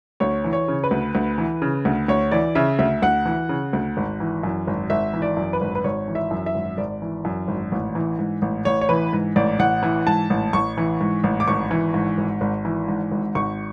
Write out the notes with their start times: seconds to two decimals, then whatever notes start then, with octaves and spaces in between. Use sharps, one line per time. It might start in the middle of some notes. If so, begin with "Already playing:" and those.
0.20 D2 C#5
0.44 E3
0.53 C#5
0.68 C#3
0.84 B4
0.91 D2
1.15 D2
1.38 E3
1.62 C#3
1.85 D2
2.08 D2 C#5
2.31 E3 D5
2.55 C#3 E5
2.79 D2 E5
3.02 D2 F#5
3.26 E3
3.49 C#3
3.73 D2
3.97 G#1
4.20 E3
4.44 F#2
4.67 G#1
4.90 G#1 E5
5.13 E3
5.22 D5
5.37 F#2
5.53 B4
5.61 G#1
5.75 B4
5.84 G#1 C#5
6.08 E3
6.15 E5
6.31 F#2
6.46 E5
6.55 G#1
6.77 G#1 D5
7.02 E3
7.25 F#2
7.48 G#1
7.72 A1
7.95 E3
8.19 G#2
8.42 A1
8.65 A1 C#5
8.81 C#5
8.89 E3 B4
9.13 G#2
9.36 A1 D5
9.59 A1 F#5
9.83 E3
10.07 G#2 A5
10.30 A1
10.53 A1 C#6
10.77 E3
11.01 G#2
11.24 A1
11.40 D6
11.48 G#1 C#6
11.71 E3
11.94 G#2
12.18 G#1
12.41 G#1
12.65 E3
12.88 G#2
13.12 G#1
13.35 G#1 C#6